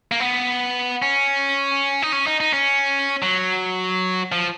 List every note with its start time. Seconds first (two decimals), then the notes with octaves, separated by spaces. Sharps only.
0.12 A#3
0.20 B3
1.02 C#4
2.02 D#4
2.12 C#4
2.27 D#4
2.40 D#4
2.53 C#4
3.22 F#3
4.32 F3